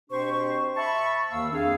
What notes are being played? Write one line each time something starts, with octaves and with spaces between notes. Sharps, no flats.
B2 C4 D4 G4 C5 C#6
E5 A5 B5 C#6
D#2 D#3 A#3 F5 E6
F2 D4 G#4 F5